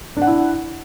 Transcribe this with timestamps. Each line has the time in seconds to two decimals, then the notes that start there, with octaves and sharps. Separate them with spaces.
0.17 D4
0.22 F#5
0.27 E4